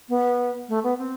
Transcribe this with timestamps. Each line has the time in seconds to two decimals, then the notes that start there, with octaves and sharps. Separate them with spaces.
0.09 B3
0.68 A3
0.83 B3
0.98 C4